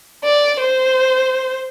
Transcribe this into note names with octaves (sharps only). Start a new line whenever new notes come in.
D5
C5